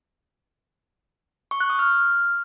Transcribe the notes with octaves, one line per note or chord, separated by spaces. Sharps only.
C#6
F#6
D#6
F6